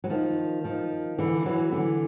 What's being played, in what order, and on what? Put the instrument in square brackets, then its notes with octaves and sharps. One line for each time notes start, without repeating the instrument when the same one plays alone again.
[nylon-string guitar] F#3
D#3 F3
D#3 F3
D3 E3
E3 F#3
D3 E3